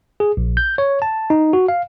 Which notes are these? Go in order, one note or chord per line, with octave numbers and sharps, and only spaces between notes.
G#4
A#1
G6
C#5
A5
D#4
F#4
F5